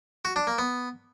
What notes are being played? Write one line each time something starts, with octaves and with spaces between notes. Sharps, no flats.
F#4
D4
A#3
B3